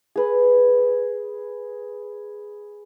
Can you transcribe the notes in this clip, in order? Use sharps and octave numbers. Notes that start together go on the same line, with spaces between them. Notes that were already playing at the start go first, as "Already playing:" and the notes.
G#4 B4